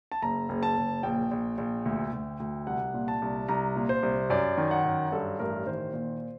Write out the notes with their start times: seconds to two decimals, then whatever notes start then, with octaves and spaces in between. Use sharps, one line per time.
0.12 A5
0.22 F#1 A#5
0.49 F#1
0.63 A5
0.77 F#1
1.03 A#1 G5
1.31 A#1
1.58 A#1
1.85 D2
2.13 D2
2.40 D2
2.67 C2 F#5
2.94 A#2
3.08 A5
3.22 C2
3.49 C2 A#5
3.76 A#2
3.89 C5
4.03 C2
4.30 F#2 D5
4.58 D#3
4.71 F#5
4.85 F#2
5.12 G2 A4
5.40 A1 A#4
5.66 D#3 C5
5.93 A#2